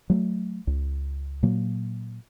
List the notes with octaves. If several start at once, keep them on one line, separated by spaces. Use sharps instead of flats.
F#3 A3
C#2
A#2 F#3 A#3